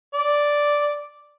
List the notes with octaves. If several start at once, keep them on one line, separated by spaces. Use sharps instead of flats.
D5